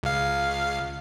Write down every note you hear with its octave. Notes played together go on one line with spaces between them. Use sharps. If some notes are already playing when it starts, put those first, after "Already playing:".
C#2 F5